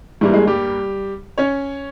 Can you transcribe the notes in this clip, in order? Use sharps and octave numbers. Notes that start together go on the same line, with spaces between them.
G2 E3 G3 A#3 E4
G#3 G#4
G3 G4
C#4 C#5